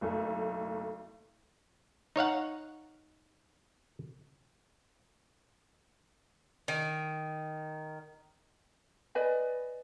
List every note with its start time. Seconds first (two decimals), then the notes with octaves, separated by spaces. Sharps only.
0.01 F#1 B1 A3
2.16 D#4 C#5 F5 F#5
6.68 D#3
9.15 B4 D5 D#5 G#5